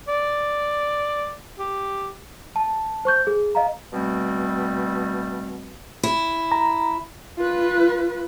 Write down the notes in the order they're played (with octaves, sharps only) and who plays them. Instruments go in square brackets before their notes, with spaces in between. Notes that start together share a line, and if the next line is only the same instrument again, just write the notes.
[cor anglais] D5
G4
[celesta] A5
C5 C#6 G6
G#4
D#5 F5 A#5
[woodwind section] B2 G3 A3 C4
[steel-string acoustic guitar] E4
[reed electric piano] A#5
[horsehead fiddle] F4 B4